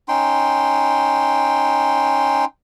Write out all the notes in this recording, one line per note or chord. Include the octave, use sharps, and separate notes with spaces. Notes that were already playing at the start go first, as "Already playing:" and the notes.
C#4 D#4 G5 C6